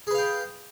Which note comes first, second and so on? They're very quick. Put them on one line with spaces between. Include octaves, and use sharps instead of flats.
G#4 B4 F5 G5